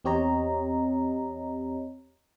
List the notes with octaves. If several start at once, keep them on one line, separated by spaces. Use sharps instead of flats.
E2 C4 G4 C#5 D#5 A#5